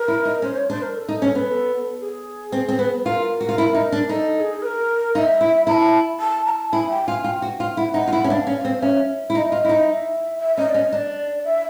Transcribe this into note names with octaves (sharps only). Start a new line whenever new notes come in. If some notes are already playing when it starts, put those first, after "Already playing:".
Already playing: A#4
E4
D#4
C#4 C5
C#5
D4 C5
A#4
A4
D#4
C#4
B3
A4
G#4
C4
C4
B3
F4 A#4
F#4
F4
E4
D#4
D4
D#4 A4
A4
G#4
B4
A#4
D#4 F5
E5
E4
E4 A#5
A5
A5
A#5
A5
E4 G#5
G5
F4 G#5
F4 G5
F#4
F4
E4 F#5
D#4
F4
E4
C#4
D4 F#5
F5
C#4
F5
C4
C#4 E5
E4
D#4 D#5
F4
E4
D#4
E5
E5
C#4 D#5
D5
C#4 D#5
D4 D5 D#5
E5